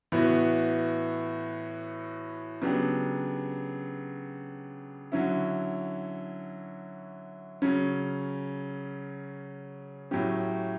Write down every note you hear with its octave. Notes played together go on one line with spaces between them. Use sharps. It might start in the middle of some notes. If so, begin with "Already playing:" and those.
A2 E3 B3 F#4
C#3 F#3 B3 D4 G4
D3 F#3 C#4 E4
C#3 F#3 C#4
A2 F#3 A3 C#4 G4